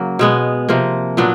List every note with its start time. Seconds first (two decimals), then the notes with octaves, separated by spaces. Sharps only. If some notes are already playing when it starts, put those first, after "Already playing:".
Already playing: C#3 F#3 A#3
0.19 B2 G#3 B3
0.69 C3 F3 A#3
1.17 A#2 F#3 B3 D4